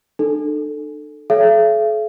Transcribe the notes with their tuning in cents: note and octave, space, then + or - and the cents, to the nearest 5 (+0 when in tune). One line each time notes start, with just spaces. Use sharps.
D4 +45 A4 +0
A4 -45 C#5 +25 E5 +45